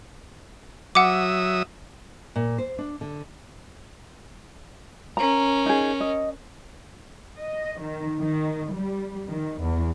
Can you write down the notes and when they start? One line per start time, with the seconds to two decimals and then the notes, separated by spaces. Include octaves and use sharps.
0.95 F#3 E5 F#5 D6 D#6
2.36 A#2
2.58 C5
2.78 D4
3.01 D3
5.17 C#4 A#4 A#5
5.66 D#4 G#4
6.01 D#5
7.39 D#5
7.81 D#3
8.17 D#3
8.73 G3
9.29 D#3
9.61 E2